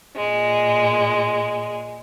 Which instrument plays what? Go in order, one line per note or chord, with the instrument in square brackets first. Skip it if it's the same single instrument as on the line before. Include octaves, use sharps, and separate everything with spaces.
[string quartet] A#2 G#3